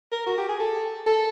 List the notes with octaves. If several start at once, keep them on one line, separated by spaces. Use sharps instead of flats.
A#4
F#4
G4
G#4
A4
A4